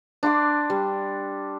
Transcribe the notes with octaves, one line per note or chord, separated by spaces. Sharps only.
D4 C6 D6
G3